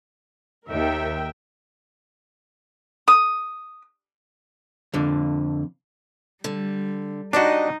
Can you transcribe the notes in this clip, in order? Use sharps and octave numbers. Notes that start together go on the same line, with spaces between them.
D#2 A#4 E5 G5
D#6
F2 D3
D3 G3
D4 D#4 F#4 G4 D5 D#5